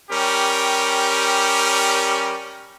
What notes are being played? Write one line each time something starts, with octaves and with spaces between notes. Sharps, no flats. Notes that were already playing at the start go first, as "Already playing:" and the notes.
G3 C#4 G4 A#4